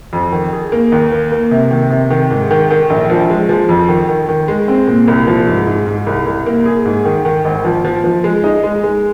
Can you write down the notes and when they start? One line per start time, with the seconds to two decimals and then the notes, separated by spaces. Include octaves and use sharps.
0.13 F2
0.32 D#3
0.53 G#4
0.72 A#3
0.92 D#2
1.12 A#3
1.31 A#3
1.51 C3
1.71 D#3
1.90 C3
2.10 D#3
2.31 G#2
2.51 D#3
2.71 D#3
2.90 A#1
3.10 F3
3.30 G#3
3.49 F3
3.69 F2
3.89 D#3
4.08 D#3
4.29 D#3
4.48 G#3
4.68 C4
4.87 A#2
5.08 C2
5.27 F3
5.47 G#2
5.67 G#2
5.87 G#2
6.07 C2
6.26 C2
6.46 A#3
6.66 G#4
6.85 G#2
7.05 D#3
7.25 D#3
7.45 G#1
7.65 F3
7.85 F3
8.04 F3
8.24 G#3
8.44 D#4
8.64 G#3
8.84 G#3